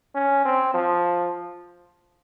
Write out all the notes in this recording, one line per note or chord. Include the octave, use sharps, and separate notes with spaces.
C#4
C4
F3